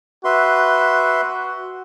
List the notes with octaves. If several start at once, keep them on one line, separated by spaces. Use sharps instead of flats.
F#4 B4 E5 C6